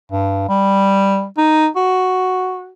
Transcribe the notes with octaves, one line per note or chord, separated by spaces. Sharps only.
G2
G3
D#4
F#4